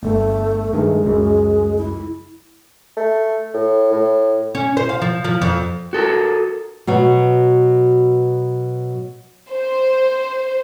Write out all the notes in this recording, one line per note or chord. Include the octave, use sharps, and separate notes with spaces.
G1 A3
G2 D#3 G#3 A3
C#2 F#2
E4
A3
A2
A2
C#4
C5
F5
F3
F3
F2
F#4 A4 A#4
B2 F#3 F#4
C5